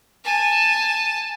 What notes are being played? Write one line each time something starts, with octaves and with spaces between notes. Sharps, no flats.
G#5 A5